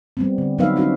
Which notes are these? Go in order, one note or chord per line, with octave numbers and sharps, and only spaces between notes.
G3 B3 C4
D3
F#3 B3 D#4 B4 E5 F5
C4 C#4 D#4 E4 F#4